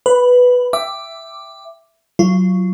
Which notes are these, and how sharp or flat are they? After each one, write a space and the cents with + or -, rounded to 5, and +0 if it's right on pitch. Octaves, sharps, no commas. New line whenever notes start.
B4 +0 B5 +25
E5 +5 G5 +0 D6 +0
F#3 +0 F4 -25